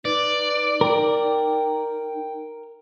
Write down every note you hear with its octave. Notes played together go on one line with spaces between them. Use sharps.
D#4 B4 D5
A#4 G5